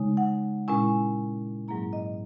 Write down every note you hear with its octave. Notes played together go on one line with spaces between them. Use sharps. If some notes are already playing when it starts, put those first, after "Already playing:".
Already playing: C#3 G#3 D#4
F#5
A#2 G#3 C#4 E4 G#5
G#2 F#3 A#3 E4 A#5
D#5